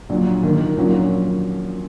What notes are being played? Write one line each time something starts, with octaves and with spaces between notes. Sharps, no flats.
A#1 A#2 F#3
D#2 D#3 A#3
A#1 A#2 F#3 A#3 C#4